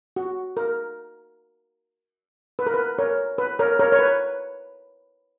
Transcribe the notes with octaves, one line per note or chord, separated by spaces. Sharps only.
F#4
A#4
B4
A#4
B4
A#4 C#5
B4
A#4 C#5
A#4 C#5
C#5
B4